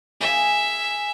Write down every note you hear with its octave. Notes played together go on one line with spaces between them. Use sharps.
G#4 E5 G#5